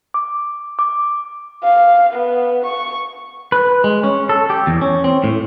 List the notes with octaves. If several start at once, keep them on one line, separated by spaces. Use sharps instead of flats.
D6
D6
F5
B3
C#6
B4
G#3
C#4
A4
G4
E2
C#4
C4
A2